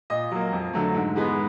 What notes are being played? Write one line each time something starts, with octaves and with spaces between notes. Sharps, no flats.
A#2 D#5
F#3 A#3
F2
D3 F#3 A3
G#2
E3 G#3 B3